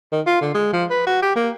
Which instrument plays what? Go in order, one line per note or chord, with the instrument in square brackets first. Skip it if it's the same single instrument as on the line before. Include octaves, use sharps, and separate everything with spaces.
[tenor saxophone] D#3
F4
D3
G#3
F3
B4
F#4
G4
A#3